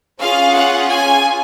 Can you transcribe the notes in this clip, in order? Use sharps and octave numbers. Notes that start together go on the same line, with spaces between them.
C#4 F4 G#4 F5
F#5
G#5